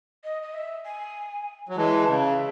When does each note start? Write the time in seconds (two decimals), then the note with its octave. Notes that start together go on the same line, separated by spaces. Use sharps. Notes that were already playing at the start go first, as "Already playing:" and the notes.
0.24 D#5
0.42 D#5
0.54 E5
0.85 G#5
1.69 F#3
1.76 E3 G#3 A5
2.08 C#3
2.23 E5